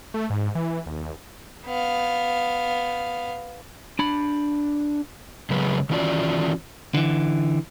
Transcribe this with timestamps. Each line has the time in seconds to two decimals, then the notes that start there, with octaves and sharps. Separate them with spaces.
0.14 A3
0.30 G#2
0.55 E3
0.86 D#2
1.66 B3 F5
3.99 D4 B5
5.50 C#3 F#3 G#3 A#3 B4
5.90 D#3 E3 C#4 F4 F#4 D5
6.94 D3 E3